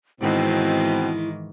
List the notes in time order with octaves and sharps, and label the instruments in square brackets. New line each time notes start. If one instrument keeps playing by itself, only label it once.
[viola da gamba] G#2 D#3 E3 [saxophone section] B2 C4 [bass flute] E4